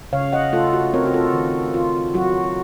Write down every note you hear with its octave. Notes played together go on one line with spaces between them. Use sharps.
C#3 C#5 F5
D#5 F#5
A3 F4 A4
F#4
C4 A#4 C#5
F#4
F4 A4
D#3
F4
F#3 F#4